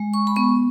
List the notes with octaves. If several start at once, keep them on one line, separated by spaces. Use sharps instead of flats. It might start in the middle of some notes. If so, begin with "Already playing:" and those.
Already playing: G#3
C#6
B5
B3 C#6